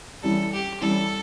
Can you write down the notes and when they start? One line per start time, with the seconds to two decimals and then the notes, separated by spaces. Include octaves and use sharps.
0.23 E3 G3 C#4 A4
0.53 G4
0.81 E3 G3 C#4 A4